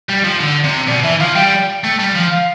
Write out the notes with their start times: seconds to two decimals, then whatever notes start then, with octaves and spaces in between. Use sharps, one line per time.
0.09 G3
0.25 F3
0.40 D3
0.64 C3
0.88 B2 D5
1.04 E3 E5
1.20 F3 F5
1.35 G3 G5
1.84 A3
1.99 G3
2.15 F3
2.31 F5